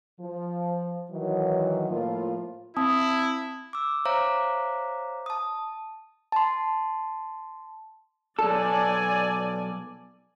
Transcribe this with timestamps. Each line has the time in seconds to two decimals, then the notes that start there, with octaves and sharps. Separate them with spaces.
0.20 F3
1.11 D#3 E3 F#3
1.89 A2 F3 A#3 F4
2.77 C4 E4 A5 D#6
3.73 D6 E6
4.05 C5 C#5 E5 F5 A#5 D6
5.26 A5 D#6
6.32 A5 C6
8.39 B1 A4 D5 G#5